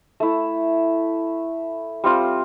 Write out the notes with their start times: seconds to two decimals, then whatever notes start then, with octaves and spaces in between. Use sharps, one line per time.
0.20 A3 E4
2.04 G3 C4 F4